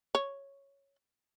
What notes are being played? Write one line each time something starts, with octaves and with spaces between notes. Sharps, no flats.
C#5